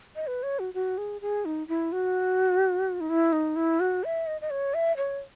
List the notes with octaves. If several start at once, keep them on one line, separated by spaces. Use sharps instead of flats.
D#5
B4
C#5
F#4
F#4
G#4
G#4
D#4
E4
F#4
D#4
E4
D#4
E4
F#4
E5
D#5
D#5
C#5
E5
C#5